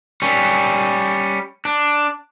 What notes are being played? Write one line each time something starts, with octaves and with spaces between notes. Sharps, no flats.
G3 C#4
D4